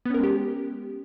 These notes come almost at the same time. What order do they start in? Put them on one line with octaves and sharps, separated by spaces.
B3 C#4 A#4 G#3 G4